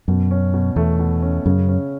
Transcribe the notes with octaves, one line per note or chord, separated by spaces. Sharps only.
F#2 B2
C#4
B2
E2 A3
B2
C#4
F#2 C#3
C#4